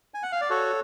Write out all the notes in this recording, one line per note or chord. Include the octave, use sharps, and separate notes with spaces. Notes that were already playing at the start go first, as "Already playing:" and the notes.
G#5
F#5
F5
D5
F#4 A4 C#5